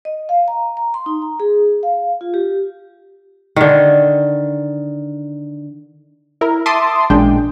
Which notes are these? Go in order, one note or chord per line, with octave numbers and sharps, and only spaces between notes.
D#5
F5
A#5
A#5
C6
D#4
A#5
G#4
F5
F4
G4
D3 D#3
E4 A#4
E5 A5 C6 D6 D#6
A1 A#2 G#3 D4 G5